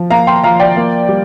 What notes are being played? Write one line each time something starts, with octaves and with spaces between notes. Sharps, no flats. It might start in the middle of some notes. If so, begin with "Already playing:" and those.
Already playing: F3
A#3 F5 A#5
G5 C6
F3 F5 A#5
D5 G5
A#3
G3